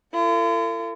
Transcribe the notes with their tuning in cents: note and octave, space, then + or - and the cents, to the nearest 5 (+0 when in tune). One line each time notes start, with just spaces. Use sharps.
F4 -45 A4 +40